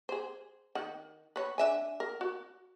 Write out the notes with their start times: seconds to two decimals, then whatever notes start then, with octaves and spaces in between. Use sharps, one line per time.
0.09 G#4 C5
0.75 D#3 F#5
1.36 B4 C#5
1.58 D4 E5 G#5
2.00 A#4
2.21 F#4